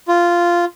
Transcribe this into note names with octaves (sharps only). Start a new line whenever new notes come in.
F4